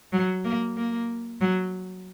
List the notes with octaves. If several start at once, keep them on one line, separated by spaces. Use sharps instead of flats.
F#3
A#3
A#3
F#3